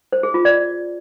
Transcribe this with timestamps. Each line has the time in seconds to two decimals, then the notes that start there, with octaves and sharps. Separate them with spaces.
0.13 C5
0.23 G#4
0.34 F4
0.45 D5